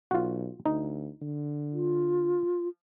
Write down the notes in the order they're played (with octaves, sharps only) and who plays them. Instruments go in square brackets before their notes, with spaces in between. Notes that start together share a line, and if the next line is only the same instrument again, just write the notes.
[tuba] B1 [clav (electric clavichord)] F4 F#4
[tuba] D2 [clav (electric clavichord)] D#4
[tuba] D3
[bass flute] F4